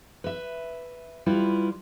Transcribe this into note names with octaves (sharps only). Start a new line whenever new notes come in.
B4 E5
G3 E4 F4 B4